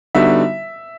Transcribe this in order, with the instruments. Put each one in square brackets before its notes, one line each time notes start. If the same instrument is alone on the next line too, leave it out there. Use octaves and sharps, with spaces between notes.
[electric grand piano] D3 G3 B3 D#4 F#4 [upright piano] E5